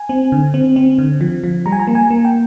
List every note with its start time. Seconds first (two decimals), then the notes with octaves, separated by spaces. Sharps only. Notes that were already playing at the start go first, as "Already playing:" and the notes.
Already playing: G#5
0.09 C4
0.32 D3
0.54 C4
0.76 C4
0.98 D3
1.21 F3
1.44 F3
1.66 G3 A#5
1.72 G#5
1.80 A#5
1.87 A#3
1.95 G#5
2.11 A#3
2.25 G5